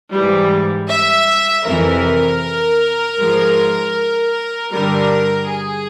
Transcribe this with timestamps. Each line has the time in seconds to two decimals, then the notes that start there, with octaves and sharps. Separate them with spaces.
0.12 G#2 E3 G3
0.89 E5
1.65 F2 C3 E3 A#4
3.19 G#2 F3 G#3
4.72 G2 D3 G3 A#4
5.47 G#4